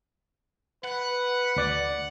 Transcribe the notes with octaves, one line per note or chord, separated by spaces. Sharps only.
B4 F#5
D2 D5 A6